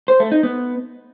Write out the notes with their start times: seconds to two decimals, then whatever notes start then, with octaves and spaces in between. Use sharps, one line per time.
0.08 C5
0.20 A3
0.32 D#4
0.43 B3